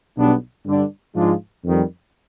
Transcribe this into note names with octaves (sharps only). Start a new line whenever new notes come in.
B1 B2 G3 B3 D4
G2 D3 G3 D4
G#2 F3 G#3 D4 F4
F2 D#3 G3